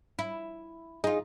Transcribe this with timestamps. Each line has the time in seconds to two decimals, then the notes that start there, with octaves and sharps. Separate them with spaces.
0.19 E4
1.04 D#4 F4 G#4 D#5